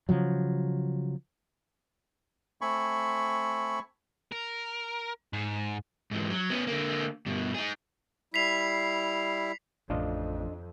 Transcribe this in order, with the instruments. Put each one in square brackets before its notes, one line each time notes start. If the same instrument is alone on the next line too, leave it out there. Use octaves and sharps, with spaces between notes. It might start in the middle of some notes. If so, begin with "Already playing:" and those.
[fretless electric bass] C#3 F3 F#3
[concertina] A3 C4 G#5 B5 C#6
[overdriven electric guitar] A#4
G#2
G#2 E3
F#3
B3 C#4
D3 A#3
G2 B2
D#4 G#4
[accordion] G3 E4 [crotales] B6 C7 F7
[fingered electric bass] A1 [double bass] F2 [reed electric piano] D4 F4 D#5